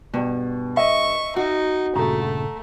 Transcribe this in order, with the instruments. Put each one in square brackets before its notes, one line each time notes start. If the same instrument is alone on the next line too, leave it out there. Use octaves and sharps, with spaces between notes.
[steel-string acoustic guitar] G2 [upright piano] B2
[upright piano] D#5 E5 [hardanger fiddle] C#6
[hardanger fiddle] D#4 [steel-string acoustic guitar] F#4
[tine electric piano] G2 A#2 C#3 [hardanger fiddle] A3 [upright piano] A#5